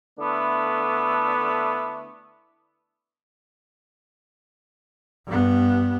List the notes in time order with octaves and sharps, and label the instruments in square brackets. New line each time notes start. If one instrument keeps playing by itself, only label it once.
[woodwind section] D3 A3 B3 D4 E4
[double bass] G2 B3